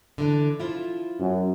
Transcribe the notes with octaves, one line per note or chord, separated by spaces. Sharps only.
D3 E3 D4
F3 E4 F4
F#2